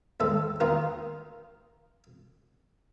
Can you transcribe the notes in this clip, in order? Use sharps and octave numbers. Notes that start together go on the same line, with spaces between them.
D#2 G#2 A4
D#2 D#3 D#4 F4 A#4